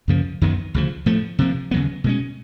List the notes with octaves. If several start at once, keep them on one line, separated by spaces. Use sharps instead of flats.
F#2 C#3 F3 A#3
F#2 D#3 F#3 B3
D2 C#3 F3
A2 F3 A3
C3 F3 A#3
D#2 C#3 F#3 B3
B2 G#3 C#4